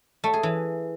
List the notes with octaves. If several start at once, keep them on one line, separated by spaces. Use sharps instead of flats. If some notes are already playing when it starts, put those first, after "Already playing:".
A3
G#4
E3